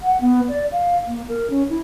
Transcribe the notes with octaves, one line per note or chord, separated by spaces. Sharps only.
F#5
B3
D5
F5
A#3
A#4
C#4
E4